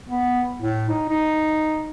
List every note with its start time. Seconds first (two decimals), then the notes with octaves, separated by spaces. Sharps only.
0.09 B3
0.62 A2
0.89 D#4
1.09 D#4